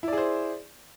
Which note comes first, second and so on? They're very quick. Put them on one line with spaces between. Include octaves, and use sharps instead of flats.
E4 D5 G#4 C5